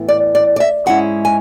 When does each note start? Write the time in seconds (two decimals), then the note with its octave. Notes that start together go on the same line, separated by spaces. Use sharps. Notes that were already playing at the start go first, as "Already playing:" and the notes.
Already playing: A2 E3 B3 E4
0.08 D5
0.35 D5
0.56 D5
0.60 E5
0.86 G#2 G#3 C#4 E4 F#5
1.25 G#5